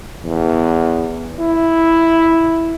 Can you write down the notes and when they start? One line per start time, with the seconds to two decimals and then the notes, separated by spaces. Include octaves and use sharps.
0.24 E2
1.39 E4